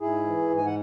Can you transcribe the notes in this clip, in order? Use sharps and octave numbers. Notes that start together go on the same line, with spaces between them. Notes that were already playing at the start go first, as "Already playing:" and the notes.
G#2 E4 G#4
E3
G#2
G#5
F#5